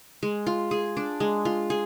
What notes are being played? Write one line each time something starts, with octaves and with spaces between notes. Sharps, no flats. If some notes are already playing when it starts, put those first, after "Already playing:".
G#3
F4
G#4
D4
G#3
F4
G#4